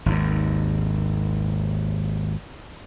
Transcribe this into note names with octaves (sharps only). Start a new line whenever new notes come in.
G#1 D#2